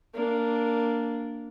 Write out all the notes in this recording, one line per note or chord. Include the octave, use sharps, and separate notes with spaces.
A#3 D4